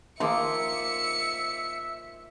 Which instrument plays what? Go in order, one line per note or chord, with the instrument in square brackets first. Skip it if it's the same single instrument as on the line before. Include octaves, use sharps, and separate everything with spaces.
[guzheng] D#3 F3 A#3 [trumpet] E5 [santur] C6 D6 D#6 [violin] C#7